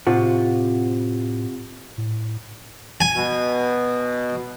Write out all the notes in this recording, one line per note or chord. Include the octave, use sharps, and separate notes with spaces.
A2 C3 F4 F#4
A2
G#5
B2